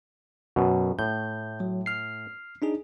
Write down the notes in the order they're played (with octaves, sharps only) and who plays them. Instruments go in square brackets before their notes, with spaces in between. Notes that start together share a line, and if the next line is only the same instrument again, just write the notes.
[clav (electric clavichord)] F#2 B2
[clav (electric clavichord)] A2 [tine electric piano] G6
[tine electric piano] F#3
F6 C7
D4 D#4 G#4